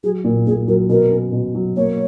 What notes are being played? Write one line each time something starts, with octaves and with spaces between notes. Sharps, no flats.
F#3 G#4
A#2
A#2 G#4
F#3 A#4
B2 A#4
C#4
B2
F#3
A#3 C#5